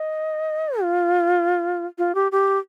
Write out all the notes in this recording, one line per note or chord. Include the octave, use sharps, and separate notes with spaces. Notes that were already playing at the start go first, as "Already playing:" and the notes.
Already playing: D#5
F4
F4
G4
G4